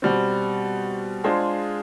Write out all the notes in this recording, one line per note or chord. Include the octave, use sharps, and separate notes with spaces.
B2 G3 C4
G#3 D4 F4 G#4 C5